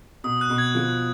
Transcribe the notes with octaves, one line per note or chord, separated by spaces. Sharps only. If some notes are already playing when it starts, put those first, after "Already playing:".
B2 D#6
F#6
B2
G#6
F3